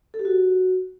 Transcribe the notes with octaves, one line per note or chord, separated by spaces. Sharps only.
A4
G4
F#4